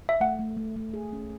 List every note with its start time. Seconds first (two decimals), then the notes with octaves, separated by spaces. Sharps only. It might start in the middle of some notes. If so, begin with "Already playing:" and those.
0.09 E5
0.20 A3 F#5
0.39 A3
0.57 A3
0.76 A3
0.94 G#4
1.13 C#4